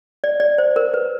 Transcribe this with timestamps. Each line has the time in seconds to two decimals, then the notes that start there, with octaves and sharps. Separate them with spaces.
0.24 D5
0.40 D5
0.58 C5
0.76 A#4
0.94 B4